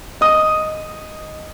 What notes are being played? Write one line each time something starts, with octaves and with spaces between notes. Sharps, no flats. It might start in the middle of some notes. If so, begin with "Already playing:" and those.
D#5 D#6